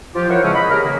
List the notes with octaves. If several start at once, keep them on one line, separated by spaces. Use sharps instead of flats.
F3 F4 G4
E4 A#4 C5 C#5 F5 F#5
E2 C#3 F3 G#3 C4 C#4
D#5 B5
C#4 G4 G#4 A#4
C#3 E3 A#3